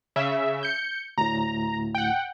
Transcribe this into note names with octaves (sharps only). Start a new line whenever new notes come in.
C#3 E5
G6 C#7
D2 A2 A#5
F#5 G5